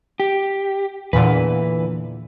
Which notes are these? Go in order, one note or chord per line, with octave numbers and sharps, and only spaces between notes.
G4
E2 A#2 D3 E3 B4